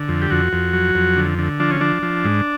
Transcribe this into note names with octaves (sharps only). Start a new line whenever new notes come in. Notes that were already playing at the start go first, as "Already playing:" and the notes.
Already playing: D3
F2
G4
F2 F#4
F2
F#3
F2
D3
D3
F3 D4
C#4
F3 D4
F3
G#2